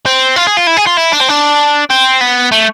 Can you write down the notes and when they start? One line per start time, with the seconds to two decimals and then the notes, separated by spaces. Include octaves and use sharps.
0.06 C4
0.36 F4
0.47 G#4
0.57 F4
0.67 E4
0.77 G#4
0.87 F4
0.97 E4
1.13 D4
1.21 C4
1.29 D4
1.90 C4
2.21 B3
2.52 A3